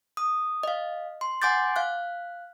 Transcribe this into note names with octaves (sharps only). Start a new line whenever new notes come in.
D#6
D#5 F5
C6
F#5 G#5 C6 D6 G6 A6
F5 F#6